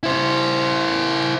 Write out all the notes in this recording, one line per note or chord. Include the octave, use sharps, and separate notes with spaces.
E4 C5